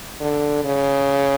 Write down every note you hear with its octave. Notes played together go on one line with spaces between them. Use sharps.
D3
C#3